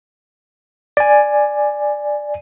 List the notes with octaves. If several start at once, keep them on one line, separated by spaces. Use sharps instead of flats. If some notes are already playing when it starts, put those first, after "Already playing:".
D5 G#5